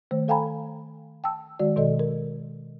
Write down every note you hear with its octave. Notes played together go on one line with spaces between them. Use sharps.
D#3 A3 C5
A4 F5 G5 G#5 A#5 B5
G5 A5 E6
D#3 G#3 F#4 D5
B2 D#3 A4 D5 D#5
A#4